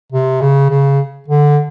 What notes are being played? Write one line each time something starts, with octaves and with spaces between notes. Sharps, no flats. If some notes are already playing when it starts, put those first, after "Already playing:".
C3
C#3
C#3
D3